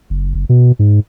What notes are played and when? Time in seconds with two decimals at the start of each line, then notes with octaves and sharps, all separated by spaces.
0.10 F#1
0.35 F#1
0.49 B2
0.79 G#2